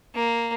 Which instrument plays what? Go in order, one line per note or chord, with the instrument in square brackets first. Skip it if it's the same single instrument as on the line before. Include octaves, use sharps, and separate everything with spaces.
[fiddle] A#3